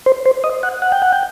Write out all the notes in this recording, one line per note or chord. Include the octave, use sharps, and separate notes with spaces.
C5
C5
D#5
F#5
F#5
G5
F#5
G5